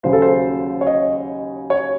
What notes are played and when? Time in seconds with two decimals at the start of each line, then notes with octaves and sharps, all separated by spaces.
0.03 D#2 C#3 F#3 C5
0.13 A4
0.22 C5
0.81 C#5
0.87 D#5
1.70 C#5